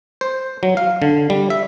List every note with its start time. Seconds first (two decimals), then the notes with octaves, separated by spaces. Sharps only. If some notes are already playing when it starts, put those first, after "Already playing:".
0.21 C5
0.63 F#3
0.77 F5
1.02 D3
1.30 G3
1.50 E5